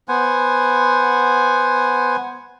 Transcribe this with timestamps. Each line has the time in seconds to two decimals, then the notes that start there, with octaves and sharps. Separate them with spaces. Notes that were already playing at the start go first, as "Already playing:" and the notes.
0.08 B3 C5 F#5 G#5